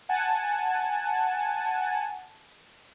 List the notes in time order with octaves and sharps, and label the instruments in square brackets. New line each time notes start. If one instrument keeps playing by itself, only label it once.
[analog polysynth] F#5 G#5 A5